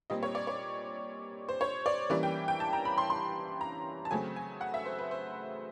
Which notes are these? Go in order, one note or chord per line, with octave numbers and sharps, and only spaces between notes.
A#2 G3 C4 D#5
C#5
D5
C#5
C5
C#5
D5
E3 G3 A#3 C#4 D5
G5
G5
A5
A#5
B5
C6
C6
A#5
A5
C#3 F#3 A3 C4 G#5
G#5
F#5
E5
C5
B4
C5